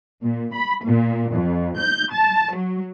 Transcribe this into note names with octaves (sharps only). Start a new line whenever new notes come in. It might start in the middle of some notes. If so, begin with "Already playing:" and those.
A#2
B5
A#2
F2
G6
A5
F#3